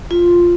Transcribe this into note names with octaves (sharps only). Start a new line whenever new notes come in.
F4